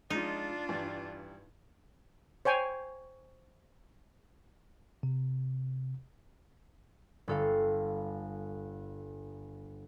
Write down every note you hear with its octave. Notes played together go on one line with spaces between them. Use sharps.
F3 G#3 D4 D#4 F4
G2 E3 G3
C5 C#5 G5 G#5
C3
G1 A4 F5